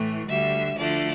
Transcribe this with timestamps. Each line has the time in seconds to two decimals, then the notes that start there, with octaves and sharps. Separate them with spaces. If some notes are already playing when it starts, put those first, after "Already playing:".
Already playing: A2 E3 A3
0.29 D2 D3 G3 E5
0.77 D2 D3 F3 A3 D5